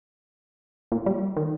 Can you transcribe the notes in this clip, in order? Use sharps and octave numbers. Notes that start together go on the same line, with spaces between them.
A#2
G3
D#3